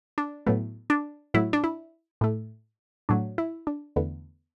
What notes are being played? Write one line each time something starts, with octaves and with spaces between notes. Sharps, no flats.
D4
A2 F#3 A3 B3
D4
A2 F#3 A3 E4
D4
E4
A2 A3
A2 F#3 A3 D4
E4
D4
E2 D3 A3 B3